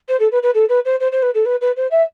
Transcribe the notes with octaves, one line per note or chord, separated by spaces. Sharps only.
C5
A4
B4
B4
A4
B4
C5
C5
C5
B4
A4
B4
B4
C5
E5